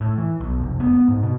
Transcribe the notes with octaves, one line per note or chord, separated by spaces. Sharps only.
A2
E3
B1
F1
B3
B3
G#2
B2